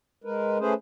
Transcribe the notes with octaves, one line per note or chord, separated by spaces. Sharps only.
G#3 A#4 B4
A3 C#4 G#4 B4 C5